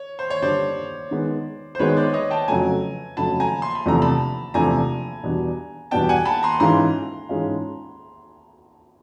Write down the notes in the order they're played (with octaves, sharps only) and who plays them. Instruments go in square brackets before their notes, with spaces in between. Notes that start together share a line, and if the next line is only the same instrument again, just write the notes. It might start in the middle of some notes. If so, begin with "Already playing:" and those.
Already playing: [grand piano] C#5
C5
C#5
[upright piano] G2 D3 G3 [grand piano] C5 D5
[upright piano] D#3 G#3 B3
[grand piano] C5
[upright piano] D#3 G#3 B3 [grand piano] B4 C#5
[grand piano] C5 D5
C#5 D#5
G5 A5
[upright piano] F2 C#3 F#3 A3 [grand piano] G#5 A#5
[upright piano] F2 C#3 F#3 A3 [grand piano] A5 B5
[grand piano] G#5 A#5
C6
B5
[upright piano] E2 C3 F3 A3 D4 [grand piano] A#5
[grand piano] A5 B5
[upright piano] E2 C3 F3 A3 D4 [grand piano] G#5 A#5
[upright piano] E2 B2 G3 B3 D4
[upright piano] E2 B2 G3 B3 D4 [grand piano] G5 A5
[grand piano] F#5 G#5
A5 B5
A#5 C6
[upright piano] G#2 E3 G#3 C#4 F4 [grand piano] A#5 C6
[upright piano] G#2 E3 G#3 C#4 F4